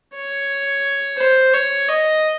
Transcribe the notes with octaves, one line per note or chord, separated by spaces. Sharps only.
C#5
C5
C#5
D#5